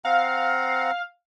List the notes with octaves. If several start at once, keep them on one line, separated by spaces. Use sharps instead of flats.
C4 F5 F#5 A#5